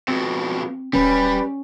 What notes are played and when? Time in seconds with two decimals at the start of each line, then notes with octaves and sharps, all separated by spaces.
0.08 F2 B2 C4
0.93 D1 G3 C#4 B4